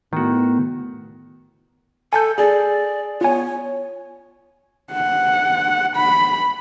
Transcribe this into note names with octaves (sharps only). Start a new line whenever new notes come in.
A2 D#3 B3 F#4
A4 G#5 A5 G6
G#4 D5
B3 F4 C#5 G#5
F#5
B5